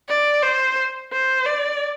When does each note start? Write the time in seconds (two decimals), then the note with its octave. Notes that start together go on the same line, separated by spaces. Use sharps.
0.09 D5
0.42 C5
1.12 C5
1.46 D5